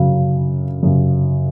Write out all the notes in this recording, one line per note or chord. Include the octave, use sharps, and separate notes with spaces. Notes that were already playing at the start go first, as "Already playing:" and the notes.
Already playing: F#2 C#3 F#3
F#2 C#3 F#3